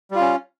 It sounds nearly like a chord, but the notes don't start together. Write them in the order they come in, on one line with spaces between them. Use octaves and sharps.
G3 F4 C#4